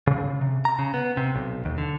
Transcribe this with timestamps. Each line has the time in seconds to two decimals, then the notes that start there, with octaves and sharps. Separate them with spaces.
0.07 C#3
0.41 C3
0.65 A#5
0.79 C#3
0.94 B3
1.17 C3
1.35 B1
1.65 D#2
1.78 D3